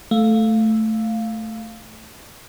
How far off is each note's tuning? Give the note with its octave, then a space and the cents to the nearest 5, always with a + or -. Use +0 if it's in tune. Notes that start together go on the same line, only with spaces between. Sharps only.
A3 +0 F5 +0